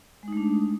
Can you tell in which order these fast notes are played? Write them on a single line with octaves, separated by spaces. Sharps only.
G#3 D#4 A3 D4